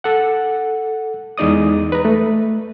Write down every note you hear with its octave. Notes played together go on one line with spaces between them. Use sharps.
A4 F#5
E2 G#3 D#4 D5 D#6
B4 A#5
A3